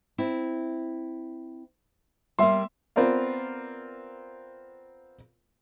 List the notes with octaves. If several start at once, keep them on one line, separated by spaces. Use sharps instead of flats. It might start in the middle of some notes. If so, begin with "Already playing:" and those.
C4 E4
G3 A#3 E5 C6
B3 C4 F4 A#4 D5 F5